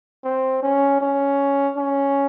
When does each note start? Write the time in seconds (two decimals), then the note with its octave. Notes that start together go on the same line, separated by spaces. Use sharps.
0.24 C4
0.63 C#4
1.01 C#4
1.77 C#4